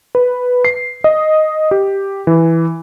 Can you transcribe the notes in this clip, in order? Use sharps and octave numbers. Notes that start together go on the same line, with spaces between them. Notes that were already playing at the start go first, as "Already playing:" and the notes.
B4
C7
D#5
G4
E3